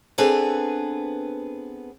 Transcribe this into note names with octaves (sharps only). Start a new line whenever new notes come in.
B3 C4 D4 G#4 A4 B4